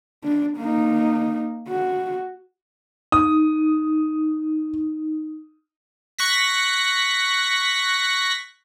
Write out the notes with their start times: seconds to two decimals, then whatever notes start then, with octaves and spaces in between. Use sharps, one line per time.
0.24 D4
0.58 A#3 D#4
1.69 F#4
3.12 D#4 D#6
6.18 C#6 F#6 A#6 B6